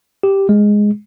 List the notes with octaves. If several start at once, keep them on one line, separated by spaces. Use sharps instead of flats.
G4
G#3